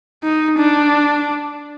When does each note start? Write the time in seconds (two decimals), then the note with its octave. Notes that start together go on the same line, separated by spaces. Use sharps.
0.24 D#4
0.59 D4